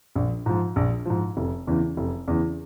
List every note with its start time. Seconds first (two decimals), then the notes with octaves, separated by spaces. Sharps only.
0.16 A#1
0.46 G#2 F3
0.76 A#1
1.05 G#2 F3
1.37 F1
1.67 E2 C#3 E3
1.97 F1
2.28 E2 C#3 E3